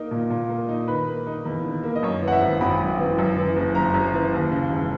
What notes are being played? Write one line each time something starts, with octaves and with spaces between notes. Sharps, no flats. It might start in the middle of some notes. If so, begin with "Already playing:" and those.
Already playing: A#3 D#4 A#4
A#2
A#2
A#3
D#4
D#3 B4
A#3
D#4
E2
D#3
A#3
D#5
F#2 C#5
E3
F#5
E5
G#1
G#1 B5
F#2
E3
F#2
E3
F#1
F#1 A#5
F#2
E3
D#2
C#3
E1